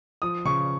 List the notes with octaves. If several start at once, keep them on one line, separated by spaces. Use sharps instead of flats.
F3 D#6
C#3 C#6